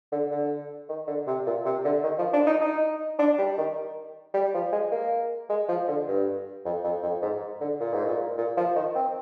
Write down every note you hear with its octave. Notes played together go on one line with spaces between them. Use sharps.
D3
D3
D#3
D3
C3
A#2
C3
D3
D#3
F3
D4
D#4
D#4
D4
G3
D#3
G3
F3
G#3
A#3
G#3
F3
D3
G2
F2
F2
F2
G#2
D3
A#2
G#2
A#2
A#2
F3
D#3
C4